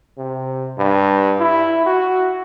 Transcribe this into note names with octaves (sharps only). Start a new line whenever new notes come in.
C3
G2
E4
F#4